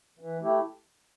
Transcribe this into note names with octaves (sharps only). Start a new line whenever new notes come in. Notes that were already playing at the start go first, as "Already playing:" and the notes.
E3
A3 E4 G4